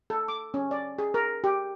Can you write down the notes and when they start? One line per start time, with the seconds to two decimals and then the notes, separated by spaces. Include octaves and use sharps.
0.10 A4
0.28 D6
0.54 C#4
0.71 D5
0.99 G#4
1.14 A#4
1.44 G4